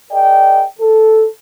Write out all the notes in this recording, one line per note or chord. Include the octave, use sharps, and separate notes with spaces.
G#4 A#4 D5 D#5 G5
A4